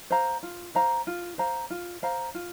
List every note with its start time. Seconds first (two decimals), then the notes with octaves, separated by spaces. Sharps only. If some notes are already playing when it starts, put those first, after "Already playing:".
0.10 C5 F5 A#5
0.43 F4
0.75 C5 F5 A#5
1.07 F4
1.38 C5 F5 A#5
1.70 F4
2.02 C5 F5 A#5
2.34 F4